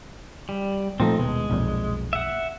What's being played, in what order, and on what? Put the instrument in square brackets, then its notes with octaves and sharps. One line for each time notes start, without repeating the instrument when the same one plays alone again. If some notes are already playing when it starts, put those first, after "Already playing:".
[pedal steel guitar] G3
[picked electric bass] A#2 F3 A3 [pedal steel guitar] C4 D#4
[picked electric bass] D#1 B2 [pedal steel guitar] G#3
[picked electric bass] B1 F2 A#2
[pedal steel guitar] E5 F#5